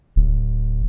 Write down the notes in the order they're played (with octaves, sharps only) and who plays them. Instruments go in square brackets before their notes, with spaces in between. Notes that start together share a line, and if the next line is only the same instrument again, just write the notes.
[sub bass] D1